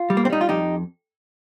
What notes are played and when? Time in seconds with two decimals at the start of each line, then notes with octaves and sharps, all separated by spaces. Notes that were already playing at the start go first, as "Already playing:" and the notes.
Already playing: F4
0.10 G3
0.17 A#3
0.25 C4
0.30 G3 D#4
0.41 F4
0.49 F2 D#4 G4